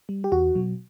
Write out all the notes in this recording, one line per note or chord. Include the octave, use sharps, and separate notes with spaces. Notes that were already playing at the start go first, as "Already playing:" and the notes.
G3
G4
E2 F#4
B2 F#3